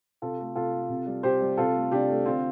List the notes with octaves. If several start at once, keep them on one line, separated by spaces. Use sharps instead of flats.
C3 F4 A4
A3
C3 F4 A4
A3
C3
G3
C3 G4 C5
G3
C3 F4 A4
A3
C3 D4 G4
A3
D3 C4 F4